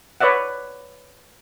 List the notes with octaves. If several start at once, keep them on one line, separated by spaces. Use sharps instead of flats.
B4 C#5 D5 E5 F#5